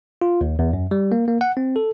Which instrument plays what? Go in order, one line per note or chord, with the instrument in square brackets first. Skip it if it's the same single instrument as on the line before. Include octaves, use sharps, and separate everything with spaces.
[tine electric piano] F4
D#2
E2
F#2
G3
A#3
A#3
F#5
C4
A4